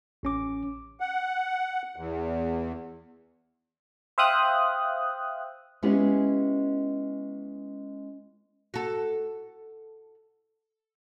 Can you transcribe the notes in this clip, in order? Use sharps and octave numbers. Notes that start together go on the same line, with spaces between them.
A1 C#4 D6
F#5
E2
C5 E5 F5 G5 D#6 F#6
G#3 B3 C#4 E4 G4
F#4 A4